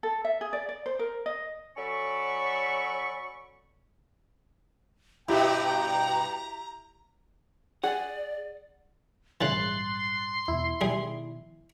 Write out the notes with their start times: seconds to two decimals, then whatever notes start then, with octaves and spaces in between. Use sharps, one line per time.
0.03 A4
0.25 E5
0.41 G#4
0.53 D5
0.69 D5
0.86 C5
0.99 A#4
1.26 D#5
1.77 F#3 C#4 A4 D5 B5 C#6
5.28 G2 B2 E4 G4 G5 A#5
7.84 G#4 D5 F#5
9.41 A#1 G#2 C#3 E3 G3 C6 F#6 A6
10.48 E2 B2 E4
10.81 B2 D#3 F3 G3 G#4